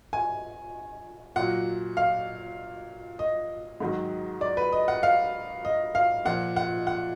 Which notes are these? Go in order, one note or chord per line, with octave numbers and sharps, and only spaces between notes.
G#5
A#2 F#3 F#5
F5
D#5
G#2 D#3 F#3
D5
B4
D#5
F#5
F5
D#5
F5
A#2 F3 F#5
F#5
F#5